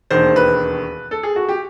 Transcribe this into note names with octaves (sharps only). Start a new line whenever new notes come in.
E1 D#2 D#3 C5
B4
A4
G#4
F#4
G4